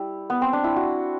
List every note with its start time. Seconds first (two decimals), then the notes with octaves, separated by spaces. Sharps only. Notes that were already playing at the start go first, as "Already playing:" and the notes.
Already playing: G3 E4
0.30 B3
0.41 C4
0.53 D4
0.64 E4
0.76 F#4